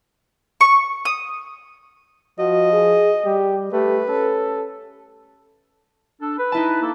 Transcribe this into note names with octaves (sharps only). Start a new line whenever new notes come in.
C#6
D#6
F3 F#4 D#5
G#4
G3 G4
A3 G4 B4
C#4 A4
D4 A4
B4
D#4 E4 A5
A#3 A4